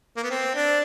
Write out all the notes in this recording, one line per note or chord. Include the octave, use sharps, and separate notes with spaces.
A#3
B3
C4
D4